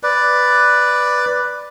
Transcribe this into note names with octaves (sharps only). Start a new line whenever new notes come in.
B4 D5